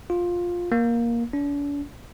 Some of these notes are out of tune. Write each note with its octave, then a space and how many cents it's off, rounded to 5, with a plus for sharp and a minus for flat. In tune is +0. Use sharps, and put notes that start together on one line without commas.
F4 +10
A#3 +10
D4 -45